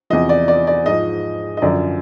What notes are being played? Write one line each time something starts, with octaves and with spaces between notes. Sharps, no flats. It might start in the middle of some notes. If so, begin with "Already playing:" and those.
E2 C3 F3 D#5
D5
D5
D5
G#2 F3 D#5
D#5
F#2 D3 F3 D5